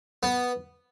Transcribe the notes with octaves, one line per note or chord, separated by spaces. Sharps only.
B3